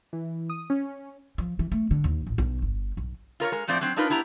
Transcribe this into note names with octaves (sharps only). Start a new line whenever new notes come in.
E3
D#6
C#4
F3
E3
A3
D3
D#2
A1
B1
G1
B1
F4 A#4 C5 C#5
G#3 A#4
A2 F3 A3 C4 D5
F#3 C4 D4
D4 D#4 F4 A#4 B4
B3 E4 G4 A#5